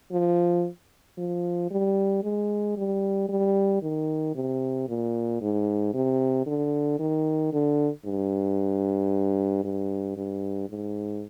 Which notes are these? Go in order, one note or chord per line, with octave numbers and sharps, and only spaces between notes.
F3
F3
G3
G#3
G3
G3
D#3
C3
A#2
G#2
C3
D3
D#3
D3
G2
G2
G2
G#2